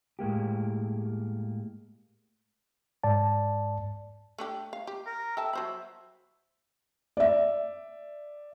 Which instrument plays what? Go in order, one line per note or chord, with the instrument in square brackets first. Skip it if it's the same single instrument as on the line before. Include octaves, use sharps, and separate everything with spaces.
[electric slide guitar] A2 G#3 A#3 G4
[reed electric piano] G#2 D5 A5
[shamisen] A3 D4 G4
F5
G4
[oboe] A#4
[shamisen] A4 G5 A5 [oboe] E5
[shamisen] F#3 C5 B5
[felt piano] D5 E5